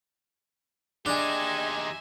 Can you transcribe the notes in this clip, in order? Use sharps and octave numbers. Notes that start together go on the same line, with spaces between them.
D4 D#4 G4 G#4 D#5 E5 G#5 C6